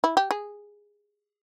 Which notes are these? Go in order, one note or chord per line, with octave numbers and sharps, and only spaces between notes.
E4
G4
G#4